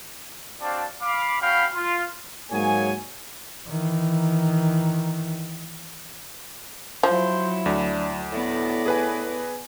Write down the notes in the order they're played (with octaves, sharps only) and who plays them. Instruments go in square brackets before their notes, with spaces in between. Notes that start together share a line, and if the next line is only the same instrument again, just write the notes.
[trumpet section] C4 D4 F#4 D5 F5 A5
F5 B5 D6
C#4 F#4 F5 G5 B5
F4
[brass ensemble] G#2 F#3 A#3 G#4 C#5 G#5
[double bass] D#3 E3
[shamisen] F3 [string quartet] F#3 E4 [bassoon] C5
[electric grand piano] D2 [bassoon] D4
[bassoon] A2 [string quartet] B3 D5 A#6
[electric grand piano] G#4 B4 G#5